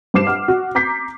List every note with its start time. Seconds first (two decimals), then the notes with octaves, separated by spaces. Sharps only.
0.14 G2 C5 D6 C7 E7
0.27 F#5 F6
0.48 F#4
0.75 A#5 D6 G6 B6 C7